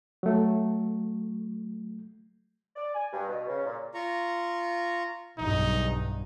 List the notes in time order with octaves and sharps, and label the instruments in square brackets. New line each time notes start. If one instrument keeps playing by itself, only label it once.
[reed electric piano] F#3 A3
[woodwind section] D5
G#5
G2
B2
C#3
A#2
[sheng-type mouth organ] F4 A#5 C#6
[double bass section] B1 E2 G2 [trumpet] D#4